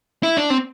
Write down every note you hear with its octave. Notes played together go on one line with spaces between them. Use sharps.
E4
D4
C4